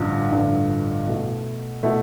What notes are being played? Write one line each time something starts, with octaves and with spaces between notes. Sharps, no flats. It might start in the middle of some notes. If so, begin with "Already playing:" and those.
Already playing: A1 G2 D3 F3
A1 G2 D3 F3
B2 A3 E4
B2 A3 E4